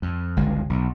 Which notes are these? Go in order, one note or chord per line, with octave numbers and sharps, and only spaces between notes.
F2
G1 C#2 G#3
B1